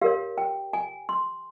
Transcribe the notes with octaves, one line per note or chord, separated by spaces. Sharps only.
G4 A#4 C#5 F5
G5
G#5
C6